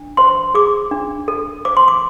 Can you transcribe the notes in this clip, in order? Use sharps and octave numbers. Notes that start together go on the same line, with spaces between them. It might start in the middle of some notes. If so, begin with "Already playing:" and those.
Already playing: D4
C5 C6
G#4 D6
D4
A4
C5 D6
C6
D6